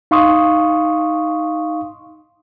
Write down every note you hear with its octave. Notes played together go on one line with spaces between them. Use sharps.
D#4 F5 C6 C#6 D#6